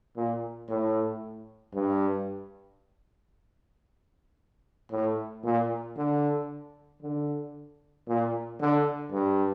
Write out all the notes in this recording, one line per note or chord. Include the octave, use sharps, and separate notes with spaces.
A#2
A2
G2
A2
A#2
D3
D3
A#2
D3
G2